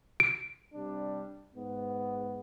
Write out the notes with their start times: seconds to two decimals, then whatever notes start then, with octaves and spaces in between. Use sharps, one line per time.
0.20 D7
0.73 C3 G3 D4
1.55 G#2 B3